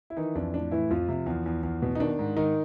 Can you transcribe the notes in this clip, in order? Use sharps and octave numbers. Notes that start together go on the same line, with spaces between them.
E4
D#3 E3 D#4
F2 D4
A2 D4
A2 E3 E4
F2 F3 F4
C3
E2
E2
E2
B2
D#4
D#3 D4
G#2
D#3 D#4